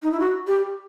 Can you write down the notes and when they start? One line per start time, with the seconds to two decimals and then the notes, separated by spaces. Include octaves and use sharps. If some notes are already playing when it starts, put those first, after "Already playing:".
0.02 D#4
0.12 E4
0.19 F#4
0.47 G4